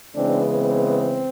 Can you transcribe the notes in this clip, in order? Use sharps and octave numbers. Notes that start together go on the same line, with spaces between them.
C#3 E3 G#3 B3 C4 D4
C4